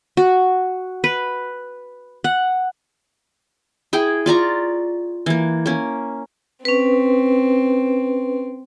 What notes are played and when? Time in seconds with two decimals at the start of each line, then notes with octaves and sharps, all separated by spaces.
0.17 F#4
1.04 B4
2.24 F#5
3.93 E4 G#4 G5
4.26 F4 D5 A#5 C#6
5.26 E3 A#3
5.66 A#3 C#4
6.65 C4 C#4 B4